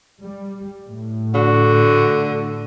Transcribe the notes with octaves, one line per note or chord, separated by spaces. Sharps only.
G3
A2
D3 F#4